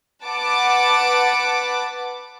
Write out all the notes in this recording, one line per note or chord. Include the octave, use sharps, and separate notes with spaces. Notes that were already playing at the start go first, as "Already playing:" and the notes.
B4 F#5 A5 D6